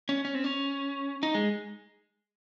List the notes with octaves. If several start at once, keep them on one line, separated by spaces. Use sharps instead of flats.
C#4
C#4
C4
C#4
D#4
G#3